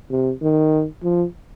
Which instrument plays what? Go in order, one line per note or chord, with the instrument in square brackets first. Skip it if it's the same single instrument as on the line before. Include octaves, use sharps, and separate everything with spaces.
[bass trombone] C3
D#3
F3